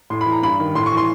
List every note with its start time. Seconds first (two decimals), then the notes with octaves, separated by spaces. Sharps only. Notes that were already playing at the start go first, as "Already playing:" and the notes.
0.10 A2 C6
0.21 B5
0.26 E3
0.32 A#5
0.43 G2 B5
0.59 D#3
0.75 A2 C6
0.86 C#6
0.92 E3
0.97 C6